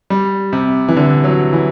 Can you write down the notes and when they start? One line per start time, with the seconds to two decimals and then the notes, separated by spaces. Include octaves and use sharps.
0.10 G3
0.53 C3
0.88 E3
0.96 D3
1.24 F#3
1.53 E3